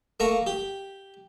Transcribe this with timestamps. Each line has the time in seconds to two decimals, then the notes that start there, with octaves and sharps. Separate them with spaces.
0.20 A3 A#3 A#5 C#6
0.47 G4